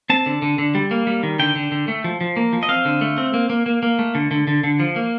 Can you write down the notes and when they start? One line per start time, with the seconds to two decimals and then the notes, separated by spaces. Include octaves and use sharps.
0.10 C4 A5
0.26 D3
0.42 D3
0.58 D3
0.75 G3
0.91 A#3
1.07 G3
1.23 D#3
1.39 D3 G5
1.56 D3
1.72 D3
1.88 A3
2.04 F3
2.21 F3
2.37 A#3
2.53 F3
2.63 D#5
2.69 C4 F5
2.85 D3
3.01 A3
3.18 C4
3.34 A#3
3.50 A#3
3.66 A#3
3.83 A#3
3.99 A3
4.15 D3
4.31 D3
4.47 D3
4.64 D3
4.80 F3
4.96 A#3